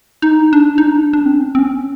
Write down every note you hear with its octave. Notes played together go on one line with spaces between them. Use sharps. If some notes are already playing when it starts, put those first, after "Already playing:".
D#4
D4
D#4
D4
D4
C4
C#4
C4
C#4